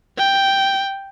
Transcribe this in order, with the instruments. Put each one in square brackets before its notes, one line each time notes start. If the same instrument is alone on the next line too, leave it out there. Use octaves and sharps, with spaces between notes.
[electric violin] G5